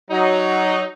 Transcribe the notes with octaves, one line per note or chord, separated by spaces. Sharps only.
F#3 D#4